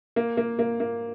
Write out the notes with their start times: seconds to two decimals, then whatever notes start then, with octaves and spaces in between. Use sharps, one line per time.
0.16 A#3
0.37 A#3
0.59 A#3
0.80 A#3